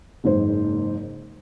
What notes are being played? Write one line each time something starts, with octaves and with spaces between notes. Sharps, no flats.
F#1 G#2 C5